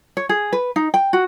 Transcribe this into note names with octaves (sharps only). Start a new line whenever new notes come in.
C#5
G#4
B4
D#4
G5
F#4